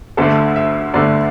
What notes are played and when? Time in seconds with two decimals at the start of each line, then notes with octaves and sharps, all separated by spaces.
0.17 D2 D3 A3 A4
0.56 E5
0.94 D2 D3 A3 D5